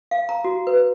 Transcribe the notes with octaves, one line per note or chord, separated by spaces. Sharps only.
F5
A#5
F#4
B4